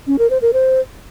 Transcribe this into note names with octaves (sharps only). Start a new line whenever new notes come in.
C#4
A#4
C5
A#4
C5